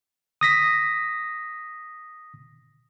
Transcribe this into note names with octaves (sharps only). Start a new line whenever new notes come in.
D#6 A#6 B6